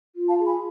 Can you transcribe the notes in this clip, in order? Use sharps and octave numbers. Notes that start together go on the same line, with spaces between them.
F4
F5 A5
G#4
G#5 B5